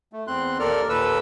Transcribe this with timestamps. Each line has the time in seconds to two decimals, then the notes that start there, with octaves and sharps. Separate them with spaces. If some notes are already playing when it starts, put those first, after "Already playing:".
0.13 A3
0.27 E2 C4 C6 F#6
0.60 D#2 A4 A#4 D5 F6
0.89 D#2 A#2 A4 B4 E6